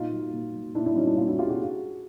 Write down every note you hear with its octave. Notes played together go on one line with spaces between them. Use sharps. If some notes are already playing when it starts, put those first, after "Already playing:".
Already playing: A#2 D#4 F4
F#3
A#2
F#3
A#2 D4 E4
D4 E4
F#3 C#4 D#4
D4 E4
A#2 D#4 F4
E4 F#4
F#3 F4 G4
F#4 G#4